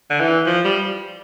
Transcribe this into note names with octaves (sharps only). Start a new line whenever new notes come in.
D3
E3
F3
G3